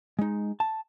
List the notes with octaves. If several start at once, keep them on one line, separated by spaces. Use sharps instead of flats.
G#3 D#4
A5